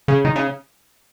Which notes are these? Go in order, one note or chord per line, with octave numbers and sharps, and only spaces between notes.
C#3
D#3
C#3